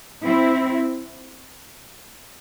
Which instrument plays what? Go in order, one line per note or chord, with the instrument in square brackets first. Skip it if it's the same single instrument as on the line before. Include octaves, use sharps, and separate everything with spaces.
[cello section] C4 E4